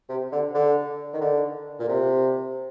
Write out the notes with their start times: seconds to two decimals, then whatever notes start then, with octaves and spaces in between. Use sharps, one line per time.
0.09 C3
0.32 D3
0.54 D3
1.13 D#3
1.21 D3
1.79 A#2
1.88 C3